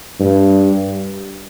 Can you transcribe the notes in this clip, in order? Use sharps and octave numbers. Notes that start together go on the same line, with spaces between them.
G2